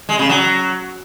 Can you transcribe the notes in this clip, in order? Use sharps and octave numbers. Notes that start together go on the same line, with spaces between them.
G#3
C#3
F#3